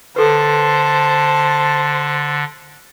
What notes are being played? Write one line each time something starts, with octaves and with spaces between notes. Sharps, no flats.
D3 A4 B4 C5 A5